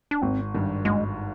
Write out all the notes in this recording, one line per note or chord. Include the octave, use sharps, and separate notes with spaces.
D4
G#1 C4
G2 D#3
G#1 G#3